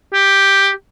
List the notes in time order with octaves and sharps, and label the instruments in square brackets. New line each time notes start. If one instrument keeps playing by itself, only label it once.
[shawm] G4